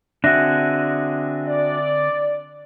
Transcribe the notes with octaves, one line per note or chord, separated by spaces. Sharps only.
D3 C4 D4 F#4 G#4 E5 F#6 A#6
D5